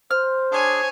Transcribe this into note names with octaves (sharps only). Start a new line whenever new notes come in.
C5 F6
D4 G#4 C#5 G#5